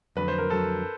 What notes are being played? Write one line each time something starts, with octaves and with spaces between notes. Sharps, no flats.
F2 D3 F#3 A3 B4
C5
A#4
F2 D3 F#3 A3 A4